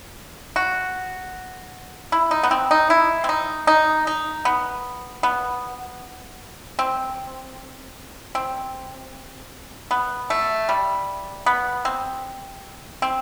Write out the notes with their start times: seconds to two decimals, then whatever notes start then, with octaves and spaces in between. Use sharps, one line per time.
0.56 F#4
2.12 E4
2.31 D#4
2.43 B3
2.51 C4
2.71 D#4
2.90 E4
3.24 C4
3.29 D#4
3.67 D#4
4.07 D#4
4.45 B3
5.23 B3
6.79 C4
8.35 C4
9.91 B3
10.30 A3
10.69 G3
11.46 B3
11.85 C4
13.02 C4